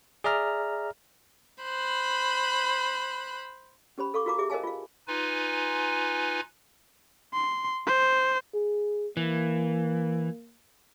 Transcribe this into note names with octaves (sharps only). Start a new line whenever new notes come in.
G#4 D5 E5 A#5 F6
C5 B5 F#6
C#4 G4 C5 B5
A4 F5 C#6 D6
F4 F#4 A#4 F5 A#5 D6
G4 G#4 E5 D6
A#4 C5 D#5 F5 G#5 A5
F4 F5
D#4 F4 B4 G#5
C6
C5
G#4
E3 A#3